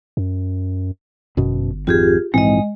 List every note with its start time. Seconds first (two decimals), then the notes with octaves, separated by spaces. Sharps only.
0.17 F#2
1.37 G1 F#2 B2
1.87 G#1 F2 C4 F4 G4 G#4
2.34 A#1 G#2 E3 G#3 C4 D#5